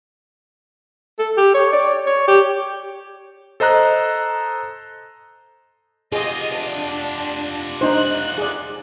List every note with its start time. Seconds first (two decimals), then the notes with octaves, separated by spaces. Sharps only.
1.19 A4
1.37 G4
1.54 C#5
1.72 D5
2.06 C#5
2.28 G4
3.60 A4 C5 D#5 A#5 F#6
6.12 F4 G4 G#4 D#5
6.55 D4
7.81 D4 D#4 C5 F#6
8.38 G#4 D5